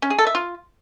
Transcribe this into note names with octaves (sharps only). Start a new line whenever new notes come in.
C#4
G#4
A4
E5
F4